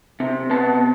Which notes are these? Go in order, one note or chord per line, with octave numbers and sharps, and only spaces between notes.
C3
B3 A5